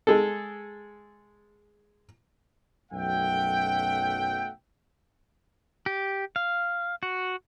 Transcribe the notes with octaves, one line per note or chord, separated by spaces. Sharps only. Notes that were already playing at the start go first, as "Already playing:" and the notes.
G#3 G#4 A4
B1 F#2 A3 E5 F#5 G5
G4
F5
F#4